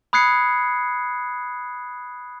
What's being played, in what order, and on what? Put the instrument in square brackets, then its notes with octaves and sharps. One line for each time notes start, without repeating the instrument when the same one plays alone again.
[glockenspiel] B5 D#6 F#6 G#6 C7 C#7